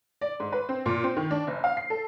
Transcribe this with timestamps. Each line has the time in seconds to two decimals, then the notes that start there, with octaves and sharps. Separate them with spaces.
0.21 D5
0.40 G#2
0.52 B4
0.69 C4
0.86 A#2
1.04 C4
1.17 D#3
1.31 D4
1.47 F#1
1.64 F5
1.77 C7
1.90 A4